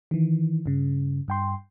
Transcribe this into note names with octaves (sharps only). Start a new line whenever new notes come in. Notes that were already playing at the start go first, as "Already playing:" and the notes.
D#3 E3
G2 C#3
G2 G5 C6